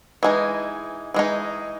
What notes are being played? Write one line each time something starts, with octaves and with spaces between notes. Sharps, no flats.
E3 G#3 D#4
E3 G#3 D#4